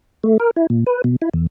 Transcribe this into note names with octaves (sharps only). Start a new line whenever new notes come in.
A3
A#4
E4
A#2
B4
B2
E4
E2